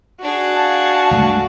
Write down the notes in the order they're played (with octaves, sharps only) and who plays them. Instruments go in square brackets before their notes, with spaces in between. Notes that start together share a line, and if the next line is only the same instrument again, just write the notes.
[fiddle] D4 G#4 [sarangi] F#4
[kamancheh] F5 A5
[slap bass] C#2 G2 A3